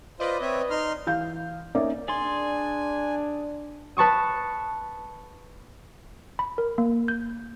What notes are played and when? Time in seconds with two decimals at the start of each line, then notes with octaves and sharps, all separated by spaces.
0.20 F4 B4 C5 D5 D#5
0.41 C4 C#5 E5
0.70 D#4 C6 F6
1.07 E3 F5 G6
1.75 A#3 C#4 D#4 D5 E5
2.08 D4 G#4 D5 G#5 C6
3.97 B4 A5 C#6 D#6
6.39 B5
6.58 A#4
6.78 A#3
7.08 G6